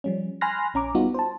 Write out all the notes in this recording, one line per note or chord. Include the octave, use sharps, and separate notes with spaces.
F3 G3 C#4
G#5 B5 C6 F6 F#6 A#6
A#1 C#4 A#5 D6
G3 B3 D#4 F4 F#4
C5 A5